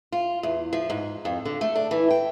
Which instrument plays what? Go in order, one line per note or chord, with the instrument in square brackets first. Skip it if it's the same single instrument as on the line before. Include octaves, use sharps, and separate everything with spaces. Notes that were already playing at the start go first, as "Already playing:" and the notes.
[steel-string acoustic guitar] F4
E2
F3
G#2
F2
D3
A3
D4
E3
G5